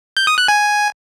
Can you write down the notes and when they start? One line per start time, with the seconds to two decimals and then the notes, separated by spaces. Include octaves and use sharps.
0.17 G6
0.27 D#6
0.38 F#6
0.48 G#5